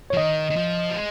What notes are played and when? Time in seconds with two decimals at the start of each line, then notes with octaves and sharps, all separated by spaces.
0.10 C#5
0.13 F3
0.17 D#3 D#5
0.50 D#3
0.56 F3
0.90 G3
0.94 G#3